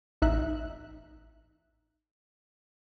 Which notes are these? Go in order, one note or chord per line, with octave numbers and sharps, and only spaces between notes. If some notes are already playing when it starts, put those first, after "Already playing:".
A1 D#4 E5 F#6